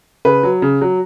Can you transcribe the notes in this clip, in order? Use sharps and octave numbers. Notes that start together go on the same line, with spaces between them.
C#3 B4
F#3
C#3
F#3